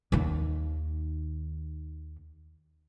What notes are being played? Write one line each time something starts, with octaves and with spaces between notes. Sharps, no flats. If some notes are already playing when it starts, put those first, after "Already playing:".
D#2 D#3